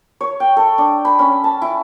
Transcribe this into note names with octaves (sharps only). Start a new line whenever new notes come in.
C#5
G5
A4
D4
B5
C#4
A5
E4